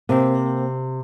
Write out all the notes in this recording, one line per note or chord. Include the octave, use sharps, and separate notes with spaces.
C3 A#3 C4